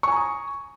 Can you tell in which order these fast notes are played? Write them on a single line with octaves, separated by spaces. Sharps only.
C#6 G#5 A#5 D#6